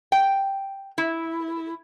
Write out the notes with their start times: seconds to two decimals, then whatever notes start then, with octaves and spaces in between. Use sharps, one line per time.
0.12 G5
0.98 E4